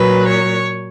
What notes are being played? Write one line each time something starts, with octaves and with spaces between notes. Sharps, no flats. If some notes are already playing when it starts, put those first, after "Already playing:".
Already playing: A#2 F#3 B4
C#5